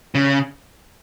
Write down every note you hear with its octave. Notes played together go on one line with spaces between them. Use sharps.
C#3